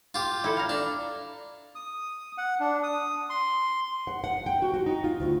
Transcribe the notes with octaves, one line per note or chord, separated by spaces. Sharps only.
F4 G4
E4 A4
F5 A#5
D4
D#6
F#5
D4
D#6
C6
F#5
F#5
G5
F#4
F#4
D#4
F4
D2